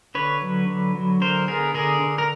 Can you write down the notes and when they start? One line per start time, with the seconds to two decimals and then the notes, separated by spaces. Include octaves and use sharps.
0.15 D3 B4 C#5
0.41 F#3
0.68 D3
0.95 F#3
1.21 D3 A#4 C5
1.48 B3 G#4 A#4
1.74 D3 G#4 A#4
2.01 D3
2.18 A#4